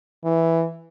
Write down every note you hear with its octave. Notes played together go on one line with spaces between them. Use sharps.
E3